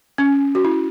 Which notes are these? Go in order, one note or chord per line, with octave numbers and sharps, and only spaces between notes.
C#4
F#4
E4